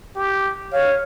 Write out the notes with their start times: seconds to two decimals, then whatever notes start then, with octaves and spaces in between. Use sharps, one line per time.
0.16 G4
0.73 C#5 F5